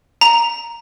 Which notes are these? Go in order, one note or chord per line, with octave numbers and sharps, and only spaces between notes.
A#5